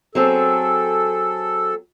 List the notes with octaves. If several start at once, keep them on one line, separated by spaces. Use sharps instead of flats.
F#3 C4 G#4 A4